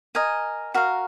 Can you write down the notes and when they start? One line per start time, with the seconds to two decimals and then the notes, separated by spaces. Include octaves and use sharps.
0.15 A#4 D#5 G#5
0.74 F#4 A#4 F5